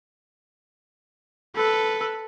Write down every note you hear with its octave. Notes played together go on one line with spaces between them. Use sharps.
A4 B4